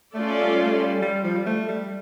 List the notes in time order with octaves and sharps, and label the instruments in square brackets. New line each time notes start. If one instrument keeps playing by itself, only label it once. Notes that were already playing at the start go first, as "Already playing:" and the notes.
[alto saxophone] A3 [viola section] C#4 F4 A4 D5
[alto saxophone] G3
A3
G3
G3
F3
G3
A3
G3